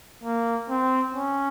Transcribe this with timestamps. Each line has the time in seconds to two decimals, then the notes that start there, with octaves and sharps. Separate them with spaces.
0.24 A#3
0.69 C4
1.14 C#4